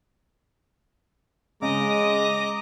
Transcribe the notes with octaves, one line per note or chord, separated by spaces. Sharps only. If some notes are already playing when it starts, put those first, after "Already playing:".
C#3 G#3 D#5 A#5 D6